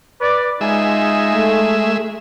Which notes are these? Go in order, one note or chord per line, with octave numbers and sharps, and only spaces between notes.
B4 D5
G#3 D#4 F4 E5 G#5
A3